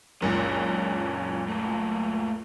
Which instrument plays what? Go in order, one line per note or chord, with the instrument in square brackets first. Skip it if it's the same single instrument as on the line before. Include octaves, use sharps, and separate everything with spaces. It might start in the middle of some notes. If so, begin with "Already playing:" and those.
[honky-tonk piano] F#1 C#2 A#2 [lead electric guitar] C#4 D4
[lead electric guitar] A3 A#3